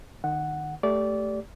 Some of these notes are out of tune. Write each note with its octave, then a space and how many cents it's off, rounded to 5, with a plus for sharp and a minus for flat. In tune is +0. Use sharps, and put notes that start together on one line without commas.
D#3 -30 F#5 +0
A3 +0 G4 +10 D5 -20